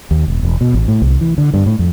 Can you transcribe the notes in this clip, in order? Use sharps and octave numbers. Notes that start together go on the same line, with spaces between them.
D#2
E1
E1
B2
A1
A2
C2
E3
D3
G2
A2
F2